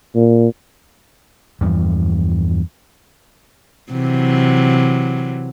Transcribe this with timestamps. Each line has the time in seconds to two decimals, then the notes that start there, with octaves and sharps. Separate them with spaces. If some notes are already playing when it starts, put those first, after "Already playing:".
0.15 A#2
1.61 E2 G2 E3 F3
3.92 C3 E3 F#3